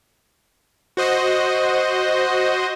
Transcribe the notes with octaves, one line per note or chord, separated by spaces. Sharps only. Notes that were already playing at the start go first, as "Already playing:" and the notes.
F#4 C5 D#5